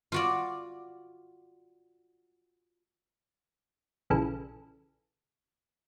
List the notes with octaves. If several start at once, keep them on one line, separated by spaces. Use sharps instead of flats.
F4 F#4 D5
A#1 C#3 E3 A4